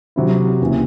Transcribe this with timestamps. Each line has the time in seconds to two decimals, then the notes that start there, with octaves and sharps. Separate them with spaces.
0.16 C3 F#3 C4 E4
0.61 D#2 C#3 E3